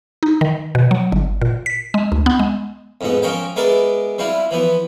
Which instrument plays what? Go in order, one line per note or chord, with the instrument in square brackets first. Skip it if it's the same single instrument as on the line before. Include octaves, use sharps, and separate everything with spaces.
[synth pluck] D#4
D#3
B2
F#3
G1
A#2
B6
G#3
D2
B3
G#3
[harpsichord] F2 G#2 B3
F3 C#4 A#4 D#5 G5
G#3 B3 A#4 D5 E5
G3 C4 E4 F4
E3 F3 B3